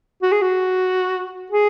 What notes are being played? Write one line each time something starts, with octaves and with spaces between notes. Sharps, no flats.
F#4
G#4
F#4
G#4